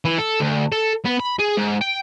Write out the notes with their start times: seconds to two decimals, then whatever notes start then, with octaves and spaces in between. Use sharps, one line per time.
0.05 E3
0.18 A4
0.41 D2
0.72 A4
1.05 B3
1.20 B5
1.39 G#4
1.58 G#2
1.81 G5